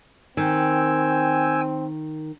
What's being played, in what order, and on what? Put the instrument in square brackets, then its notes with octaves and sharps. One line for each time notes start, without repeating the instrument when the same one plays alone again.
[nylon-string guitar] D#3 [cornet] C4 [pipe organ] G5 G#5 E6